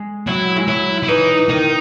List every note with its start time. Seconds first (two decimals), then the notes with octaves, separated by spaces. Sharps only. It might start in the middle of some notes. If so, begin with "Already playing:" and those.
Already playing: G#3
0.27 F#3 E4
0.56 G#3
0.68 F#3 E4
1.03 E4
1.08 E3 D#4
1.49 D#3 D#4